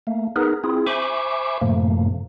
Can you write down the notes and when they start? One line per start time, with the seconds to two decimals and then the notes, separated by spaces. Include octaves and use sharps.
0.07 A3 A#3
0.36 B3 D#4 G#4 A#4 B4
0.64 C4 E4 F4 G#4
0.87 C5 E5 G#5 B5 C#6 D6
1.61 F#2 A2 C3 F3 A3 A#3